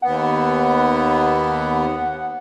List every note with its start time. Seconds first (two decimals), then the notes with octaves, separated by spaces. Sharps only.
0.02 D#2 B3 F#5